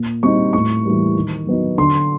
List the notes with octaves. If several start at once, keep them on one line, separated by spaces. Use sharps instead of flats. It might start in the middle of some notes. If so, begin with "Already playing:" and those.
Already playing: A#2
G3 C4 D#4 C#6
A2 C#6
E3 G3 A#3
D#3
F#3 B3 D#4
D3 C6